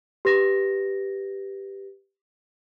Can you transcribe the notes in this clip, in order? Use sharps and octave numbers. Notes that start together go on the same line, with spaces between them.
G4 B4 A#6